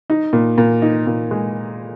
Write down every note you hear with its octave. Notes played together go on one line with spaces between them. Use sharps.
D#4
A#2
A#2
D#4
A#2
G#3